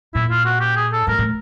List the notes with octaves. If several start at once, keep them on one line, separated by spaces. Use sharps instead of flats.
A#2 E4
F4
F#4
G4
G#4
A4
G#2 A#4
A2